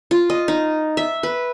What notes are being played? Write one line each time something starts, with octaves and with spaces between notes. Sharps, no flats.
F4
D#5
D#4
E5
B4